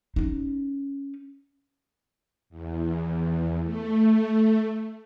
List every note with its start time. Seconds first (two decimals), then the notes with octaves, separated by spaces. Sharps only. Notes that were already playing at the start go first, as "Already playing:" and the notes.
0.16 C#4 D#4
2.50 E2
3.63 A3